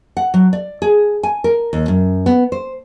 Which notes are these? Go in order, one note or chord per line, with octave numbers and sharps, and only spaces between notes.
F#5
F#3
D5
G#4
G#5
A#4
D#2
F#2
B3
C5